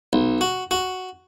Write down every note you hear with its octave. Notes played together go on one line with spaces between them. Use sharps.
B1
F#4
F#4